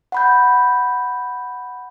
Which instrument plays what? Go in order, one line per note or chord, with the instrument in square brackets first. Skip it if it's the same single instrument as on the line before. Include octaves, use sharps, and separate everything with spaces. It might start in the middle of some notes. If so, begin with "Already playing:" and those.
[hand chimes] F#5 B5 G6